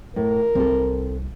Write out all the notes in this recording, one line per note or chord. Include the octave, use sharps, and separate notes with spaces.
A2 A#4
C2 C4 A4